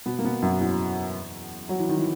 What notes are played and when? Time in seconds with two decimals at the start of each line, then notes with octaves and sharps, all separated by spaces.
0.06 B2 B3
0.19 A#3
0.24 B2 B3
0.42 F#2 F#3
0.61 E2 E3
1.69 F#3
1.80 E3
1.89 D#3
1.99 E3